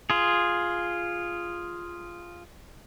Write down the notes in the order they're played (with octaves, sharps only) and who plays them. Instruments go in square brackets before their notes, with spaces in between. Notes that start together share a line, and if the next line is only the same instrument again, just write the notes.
[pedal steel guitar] F4 G#4